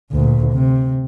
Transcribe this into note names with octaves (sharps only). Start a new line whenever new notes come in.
D2 A#2
C3